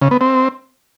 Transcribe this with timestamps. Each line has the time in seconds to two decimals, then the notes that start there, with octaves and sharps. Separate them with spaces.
0.02 C#3
0.11 B3
0.21 C4